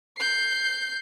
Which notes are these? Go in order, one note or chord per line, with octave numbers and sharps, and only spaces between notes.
G6 C7